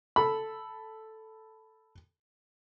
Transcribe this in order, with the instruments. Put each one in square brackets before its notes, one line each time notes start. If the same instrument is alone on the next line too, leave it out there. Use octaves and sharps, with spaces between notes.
[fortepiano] A4 B5